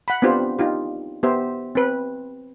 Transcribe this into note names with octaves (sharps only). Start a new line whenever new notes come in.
F#5 B5
B3 C4 D4 F4 G4 C5
D#4 F4 G4
B3 G4 C5 E5
C4 B4